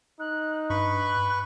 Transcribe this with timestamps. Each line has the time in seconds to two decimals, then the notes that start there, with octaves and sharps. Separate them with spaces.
0.20 D#4 F#6
0.70 G2 B4 B5 C#6 F#6